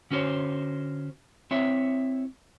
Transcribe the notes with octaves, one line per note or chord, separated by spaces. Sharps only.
D3 C#4 F#4 C5 C#5
C4 E4 C#5 E5